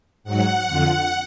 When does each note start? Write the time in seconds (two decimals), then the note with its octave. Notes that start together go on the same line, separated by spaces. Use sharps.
0.24 G#2 F#3 F#5
0.67 F2 D3 F3